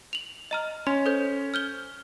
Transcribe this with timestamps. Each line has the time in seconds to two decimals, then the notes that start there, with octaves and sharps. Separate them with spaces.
0.13 F7 F#7
0.51 D#5 A#5 F6
0.87 C#4 C6
1.06 A4 C5 G6
1.54 F6 G6 G7